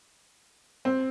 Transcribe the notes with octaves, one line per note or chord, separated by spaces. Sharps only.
C4